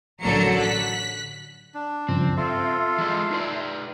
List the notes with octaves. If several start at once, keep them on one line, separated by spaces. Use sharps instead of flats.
A1 D3 F#3 A4 A#4 C#7
F#6 B6
D4
G2 C#3 F3 C4
F4 A4 E5 C6
E3 G#3 D#5
D#4 B4 D5